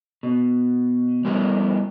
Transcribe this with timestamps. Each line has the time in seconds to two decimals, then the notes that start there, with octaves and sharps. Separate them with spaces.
0.23 B2
1.25 G3 A3 B3 E4 G4 A#4